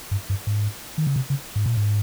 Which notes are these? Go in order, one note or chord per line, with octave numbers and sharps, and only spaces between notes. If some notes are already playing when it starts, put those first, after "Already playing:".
G2
G2
G#2
D#3
C#3
C3
C#3
G#2
A#2
G#2